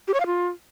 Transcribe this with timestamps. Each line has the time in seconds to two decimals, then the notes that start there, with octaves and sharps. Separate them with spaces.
0.08 G4
0.14 C#5
0.20 F5
0.26 F4